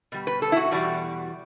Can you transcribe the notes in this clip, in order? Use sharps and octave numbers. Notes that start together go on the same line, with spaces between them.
B2 G3
B4
A4
E4
F#4
E2 B2 G3